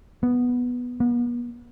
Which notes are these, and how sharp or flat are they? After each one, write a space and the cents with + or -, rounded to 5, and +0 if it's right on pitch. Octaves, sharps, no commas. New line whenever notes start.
B3 -5
B3 -40